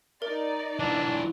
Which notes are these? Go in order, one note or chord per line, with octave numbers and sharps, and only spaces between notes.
D#4 A#4 D5
E3 F#3 D4